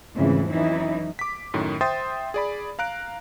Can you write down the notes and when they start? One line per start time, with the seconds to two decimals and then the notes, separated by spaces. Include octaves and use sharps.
0.15 F2 G#2 C#3 E3 A3 E4
0.49 E3 F#3 C#4 D#4 E4
1.19 D6 B6
1.54 F#2 A2 D#3
1.81 C5 E5 G5 C6 D#6 A6
2.34 G#4 D5 B5
2.79 F5 A#5 F#6 D7